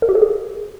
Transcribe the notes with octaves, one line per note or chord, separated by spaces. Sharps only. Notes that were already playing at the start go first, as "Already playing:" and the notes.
A#4
G4
A4
G#4